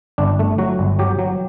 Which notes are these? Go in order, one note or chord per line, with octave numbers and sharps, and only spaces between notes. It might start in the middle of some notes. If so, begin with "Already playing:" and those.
G1 D4
A3
F#3 F#4
G1
F#3 G4
F#3